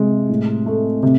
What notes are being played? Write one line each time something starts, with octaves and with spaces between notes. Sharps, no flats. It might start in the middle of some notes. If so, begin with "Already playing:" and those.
Already playing: C3 G#3
A2
A3
C3